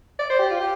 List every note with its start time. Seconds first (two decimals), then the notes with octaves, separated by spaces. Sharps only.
0.19 D5
0.30 C5
0.39 G4
0.50 F4
0.60 G4